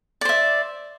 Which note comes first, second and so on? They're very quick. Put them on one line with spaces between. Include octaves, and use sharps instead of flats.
D5 C5 E5